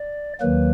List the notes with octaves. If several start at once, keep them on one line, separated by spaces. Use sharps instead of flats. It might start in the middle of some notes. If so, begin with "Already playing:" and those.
Already playing: D5
D#2 D#3 F#3 A#3 B4